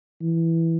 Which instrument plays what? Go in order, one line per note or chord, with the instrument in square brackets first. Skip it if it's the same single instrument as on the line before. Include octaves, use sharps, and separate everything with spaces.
[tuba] E3